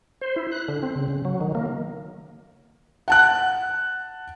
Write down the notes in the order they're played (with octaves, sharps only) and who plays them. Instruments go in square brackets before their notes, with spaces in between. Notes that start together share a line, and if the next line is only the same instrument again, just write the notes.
[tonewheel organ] C5
E4
F#6
D3
C4
C#3
C#3
F#3
D#3
A#3
[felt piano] F#5 A5 F#6